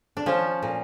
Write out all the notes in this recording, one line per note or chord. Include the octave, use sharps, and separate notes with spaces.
D4
F3 C#4
A#2